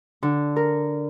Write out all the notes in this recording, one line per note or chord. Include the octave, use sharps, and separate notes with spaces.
D3
A#4